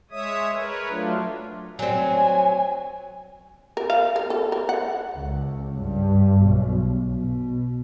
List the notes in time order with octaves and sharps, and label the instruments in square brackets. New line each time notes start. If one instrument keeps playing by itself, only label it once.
[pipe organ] G#3 C#5 E5 D#6
A#4 B4 C#5
F#3 A3 D4 F4
[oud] F#3 C4 [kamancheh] G#5
[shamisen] A#4
F5
A#4
A4
A#4
F#5
[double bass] C#2
G2
B1
B2